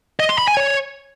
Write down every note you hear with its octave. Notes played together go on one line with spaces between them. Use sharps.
D#5
C6
B5
G#5
C#5